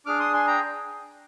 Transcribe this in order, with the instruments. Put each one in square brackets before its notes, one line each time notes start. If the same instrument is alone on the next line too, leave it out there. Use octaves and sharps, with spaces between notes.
[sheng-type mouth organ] D4 G#4 D6 F6
C6 D#6
G#5 C6
G5 A#5